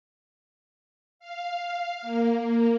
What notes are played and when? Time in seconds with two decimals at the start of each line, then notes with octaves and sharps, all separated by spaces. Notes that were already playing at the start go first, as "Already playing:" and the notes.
1.19 F5
2.02 A#3